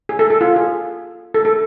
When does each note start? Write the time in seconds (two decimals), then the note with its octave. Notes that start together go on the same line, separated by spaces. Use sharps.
0.09 G#4
0.19 A4
0.30 A4
0.41 F4
0.56 G#4
1.34 A4
1.45 A4